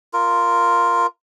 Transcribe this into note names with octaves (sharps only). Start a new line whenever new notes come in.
F4 A#4